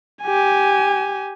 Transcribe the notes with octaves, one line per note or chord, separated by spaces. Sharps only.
G4 G#5